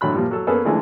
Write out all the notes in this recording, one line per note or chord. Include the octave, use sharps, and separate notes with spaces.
A2 D3 F#3 B5 F#6
A#2 F3 G3
F#3 A4
A#3 B3 C#4 G#4 A4 B4
D3 E3 F3 G#3 A3 C#4